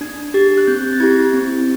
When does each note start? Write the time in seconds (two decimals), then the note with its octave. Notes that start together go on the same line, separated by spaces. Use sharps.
0.01 D4 G#6
0.34 G4 A6
0.58 F#6
0.67 C4 G6
0.93 A6
1.00 E4 G4 G#6
1.33 C4